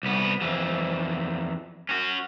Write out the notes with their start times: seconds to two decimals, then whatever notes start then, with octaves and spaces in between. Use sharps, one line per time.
0.03 C2 B3
0.41 F2 E3
1.89 C#4 F#4